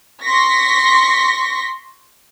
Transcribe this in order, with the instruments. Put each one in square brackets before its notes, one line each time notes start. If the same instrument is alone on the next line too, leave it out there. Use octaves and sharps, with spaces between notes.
[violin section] C6 C#6 A#6 B6